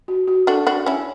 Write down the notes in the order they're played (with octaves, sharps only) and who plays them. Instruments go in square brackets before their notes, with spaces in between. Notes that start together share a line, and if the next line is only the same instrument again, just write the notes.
[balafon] F#4
F#4
[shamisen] D4 F#4 [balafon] A4
[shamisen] D4 F#4
C#4 E4